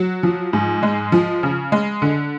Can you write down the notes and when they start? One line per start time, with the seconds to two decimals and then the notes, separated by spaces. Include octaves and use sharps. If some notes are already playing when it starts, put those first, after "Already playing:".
Already playing: F#3
0.23 F3
0.53 G#2
0.83 G#3
1.12 F3
1.43 C#3
1.72 G#3
2.02 D3